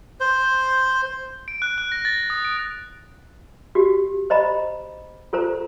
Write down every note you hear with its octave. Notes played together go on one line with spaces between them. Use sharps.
C5
D7
F#6
F#6
A#6
A6
D#6
D7
F#4 G4
C5 D#5 A#5 B5
F4 A4 C5 A#5